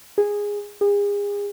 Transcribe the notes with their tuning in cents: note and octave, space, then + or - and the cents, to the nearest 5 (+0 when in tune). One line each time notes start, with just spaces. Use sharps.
G#4 -10
G#4 -35